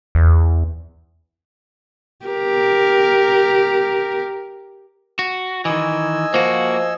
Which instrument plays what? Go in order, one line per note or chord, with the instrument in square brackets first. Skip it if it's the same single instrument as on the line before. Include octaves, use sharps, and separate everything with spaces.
[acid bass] E2
[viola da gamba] G4 A#4
[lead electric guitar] F#4
[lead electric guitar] D#3 E3 [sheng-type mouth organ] D#5 G#5 E6
[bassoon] F3 [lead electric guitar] A#3 F#4